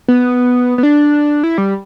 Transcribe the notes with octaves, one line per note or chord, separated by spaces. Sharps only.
B3
B3
D4
E4
G3